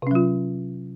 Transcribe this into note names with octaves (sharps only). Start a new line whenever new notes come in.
C3 F#3 C#4 F4